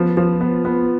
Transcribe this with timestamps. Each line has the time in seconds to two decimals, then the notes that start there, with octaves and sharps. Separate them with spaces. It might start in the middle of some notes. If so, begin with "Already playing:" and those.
Already playing: F3 B3
0.17 F3
0.41 B3
0.65 B3